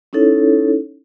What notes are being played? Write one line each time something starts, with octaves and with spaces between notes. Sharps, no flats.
C#4 D#4 E4 A4 C#5